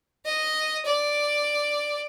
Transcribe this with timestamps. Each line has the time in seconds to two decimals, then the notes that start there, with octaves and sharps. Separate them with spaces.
0.25 D#5
0.86 D5